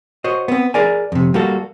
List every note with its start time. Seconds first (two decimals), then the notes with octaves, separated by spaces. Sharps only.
0.24 F#4 C5 C#5 D#5
0.48 B3 C4
0.74 G#4 A#4 D5 G#5
1.12 F2 C3
1.34 G3 A#3 F#4 A4